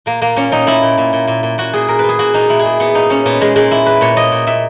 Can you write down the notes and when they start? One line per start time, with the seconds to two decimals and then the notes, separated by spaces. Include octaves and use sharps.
0.06 A#2 A#3
0.21 A#2 A#3
0.36 A#2 C#4
0.52 A#2 D#4
0.67 A#2 E4
0.82 A#2
0.98 A#2
1.13 A#2
1.27 A#2
1.43 A#2
1.58 A#2 F#4
1.73 A#2 G#4
1.88 A#2 A#4
1.99 B4
2.04 A#2 G#4
2.19 A#2 F#4
2.34 A#2 D#4
2.49 A#2 E4
2.59 G#4
2.65 A#2
2.80 A#2 B3
2.95 A#2 D#4
3.10 A#2 C#4
3.25 A#2 B3
3.41 A#2 G#3
3.56 A#2 G#3
3.71 A#2 E4
3.86 A#2 B4
4.01 A#2 C#5
4.16 A#2 D#5
4.32 A#2
4.47 A#2 E5